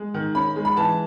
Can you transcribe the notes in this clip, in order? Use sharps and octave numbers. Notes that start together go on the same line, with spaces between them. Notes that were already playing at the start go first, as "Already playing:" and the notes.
Already playing: G#3
D#3
C#4 B5
G#3
B5
E3 A5